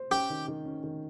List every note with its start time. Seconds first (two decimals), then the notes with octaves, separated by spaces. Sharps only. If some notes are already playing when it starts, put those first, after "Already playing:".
Already playing: C5
0.10 C#4 G4
0.30 D#3
0.48 D#3
0.65 C#4
0.84 D#3